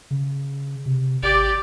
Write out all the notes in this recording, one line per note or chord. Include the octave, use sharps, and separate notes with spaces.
C#3
C3
G#1 G4 D5